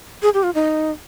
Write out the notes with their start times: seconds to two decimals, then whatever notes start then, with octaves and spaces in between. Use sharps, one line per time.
0.22 G#4
0.34 G4
0.43 F4
0.55 D#4